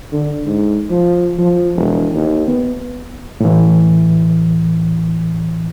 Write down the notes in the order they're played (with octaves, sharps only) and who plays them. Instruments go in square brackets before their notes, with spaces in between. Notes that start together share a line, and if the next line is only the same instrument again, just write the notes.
[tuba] D3
G#2
F3
F3
E1
D#2
B3
[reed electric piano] A2 E3